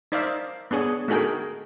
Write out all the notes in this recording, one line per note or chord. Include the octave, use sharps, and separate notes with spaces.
D#4 C5 D5 E5 F5
B3 D4 G#4 C#5
A3 D#4 F#4 G#4 A#4 G5